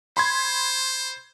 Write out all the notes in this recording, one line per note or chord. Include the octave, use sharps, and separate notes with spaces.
C5 B5 C6 G#6